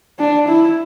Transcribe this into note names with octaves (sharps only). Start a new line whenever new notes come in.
D4
E4